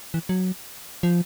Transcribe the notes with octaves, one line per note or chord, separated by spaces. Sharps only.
E3
F#3
F3